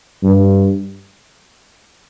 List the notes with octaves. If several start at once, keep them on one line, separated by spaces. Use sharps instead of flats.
G2